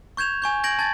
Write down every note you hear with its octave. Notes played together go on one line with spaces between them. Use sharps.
C#6 G6 G#6 E7 F7
G#5 C#6 G6
G6 G#6 A#6 D7 F#7
A5 G#6 A6